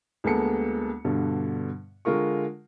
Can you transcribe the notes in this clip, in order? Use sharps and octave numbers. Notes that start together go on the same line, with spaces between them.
D2 G#3 A#3 B3 A4 C#7
G2 B2 D3
D3 G#3 F4 A#4 C#6